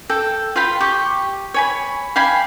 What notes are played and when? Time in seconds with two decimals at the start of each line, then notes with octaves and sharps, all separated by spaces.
0.10 A4 G5
0.56 F4 F5 G5 B5
0.80 G4 C#6
1.54 C#5 G#5 B5
2.16 F5 G5 G#5 B5